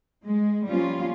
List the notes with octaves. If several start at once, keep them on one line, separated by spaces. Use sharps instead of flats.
G#3
F3 G3 A#3 C#4 F4